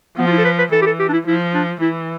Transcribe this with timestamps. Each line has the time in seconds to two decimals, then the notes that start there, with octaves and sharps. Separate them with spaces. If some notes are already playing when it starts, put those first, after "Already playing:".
0.18 F3 B3
0.27 F4
0.32 E4
0.38 A4
0.45 B4
0.59 B4
0.72 E3 A4
0.82 G4
0.86 A4
0.99 G4
1.09 D4
1.13 E4
1.27 F3 E4
1.54 D4
1.81 E3 E4